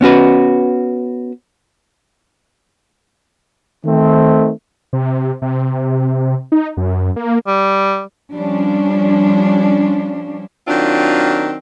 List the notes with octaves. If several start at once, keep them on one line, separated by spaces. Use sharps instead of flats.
B3 C#4 F#4 B4
D#3 A3 C4
C3
C3
D#4
F#2
A#3
G3
F3 G3 C#4 D4
D#3 F#3 C4 D4 F4